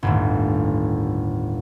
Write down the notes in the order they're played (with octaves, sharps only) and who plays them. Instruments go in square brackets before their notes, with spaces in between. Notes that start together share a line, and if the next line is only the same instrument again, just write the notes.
[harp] G1 D#2 A2